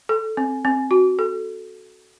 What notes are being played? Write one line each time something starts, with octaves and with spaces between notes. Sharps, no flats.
A4
C4
C4
F#4
A4